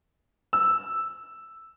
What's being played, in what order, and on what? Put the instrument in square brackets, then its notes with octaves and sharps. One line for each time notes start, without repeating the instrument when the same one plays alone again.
[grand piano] E6